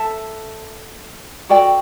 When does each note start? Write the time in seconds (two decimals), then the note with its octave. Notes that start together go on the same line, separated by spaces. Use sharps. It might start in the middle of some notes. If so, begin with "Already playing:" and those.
Already playing: A4 E5 A5
1.49 F#4 A4 D5 G5